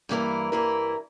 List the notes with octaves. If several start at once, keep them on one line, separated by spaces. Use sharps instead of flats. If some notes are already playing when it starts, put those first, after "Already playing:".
G2 E3 A#3 E4 A#4
G2 E3 A#3 E4 A#4